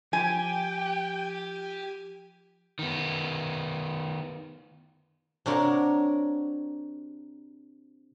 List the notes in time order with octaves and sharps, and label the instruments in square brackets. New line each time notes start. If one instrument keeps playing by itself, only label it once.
[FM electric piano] F3 [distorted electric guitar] G4 [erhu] G5 [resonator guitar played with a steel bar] G#5
[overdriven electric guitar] D#3 B3
[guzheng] C3 D4 F#4 A#4 C#5